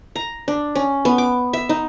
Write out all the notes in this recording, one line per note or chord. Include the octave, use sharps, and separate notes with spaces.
A#5
D4
C#4
B3
D6
E5
D#4